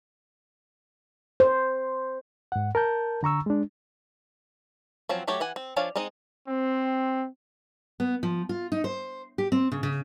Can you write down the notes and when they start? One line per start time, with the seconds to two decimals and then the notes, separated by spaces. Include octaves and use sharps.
1.40 C5
2.52 G#2 F#5
2.75 A#4 A5 G6
3.23 D3 A#5 C#6 E6
3.46 G#3 D4
5.09 F3 F#3 C4 C#4
5.28 F#3 A3 G4 C#5
5.40 E3 F#5 G#5
5.56 C4
5.76 F3 D4 C#5 F5 G#5
5.96 G#3 C4 D#4 D#5
6.48 C4
8.00 B3
8.23 F3
8.49 F4
8.72 D#4
8.84 C5
9.38 G4
9.52 C4
9.72 C#3
9.83 C#3